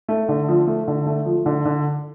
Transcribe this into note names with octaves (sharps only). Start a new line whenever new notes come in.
A3
D3
F3
A3
D3
A3
F3
D3
D3